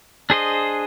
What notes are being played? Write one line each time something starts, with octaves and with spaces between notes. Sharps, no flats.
D4 G#4 C5 D#5